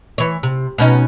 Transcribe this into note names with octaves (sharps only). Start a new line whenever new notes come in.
E3 C#5
C3
B2 C#4 D#4